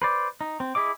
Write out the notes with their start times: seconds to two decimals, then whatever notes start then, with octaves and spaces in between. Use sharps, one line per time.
0.02 B4 C5 D5
0.41 D#4
0.60 C4
0.75 E4 G#4 D#5 D6